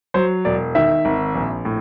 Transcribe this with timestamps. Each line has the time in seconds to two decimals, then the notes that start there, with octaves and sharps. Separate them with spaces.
0.14 F#3 C5
0.45 E1 D5
0.75 D#3 E5
1.05 G#1
1.35 A#1
1.65 A2